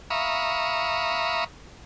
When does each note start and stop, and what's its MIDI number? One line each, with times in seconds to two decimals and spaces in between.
0.10 1.44 76
0.10 1.44 77
0.10 1.44 82
0.10 1.44 83
0.10 1.44 85
0.10 1.44 87